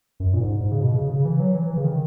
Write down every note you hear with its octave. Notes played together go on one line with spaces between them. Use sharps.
F#2
A#2
G#2
G#2
C#3
B2
C#3
C#3
E3
F#3
E3
E3
C#3
D#3